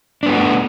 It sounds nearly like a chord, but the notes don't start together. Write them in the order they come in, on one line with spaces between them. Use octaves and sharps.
D4 B3 G4 F#4 A3